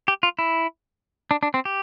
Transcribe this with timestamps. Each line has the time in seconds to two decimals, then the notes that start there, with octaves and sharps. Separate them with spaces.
0.08 G4
0.23 F4
0.39 E4
1.31 D4
1.43 D4
1.54 C4
1.65 G4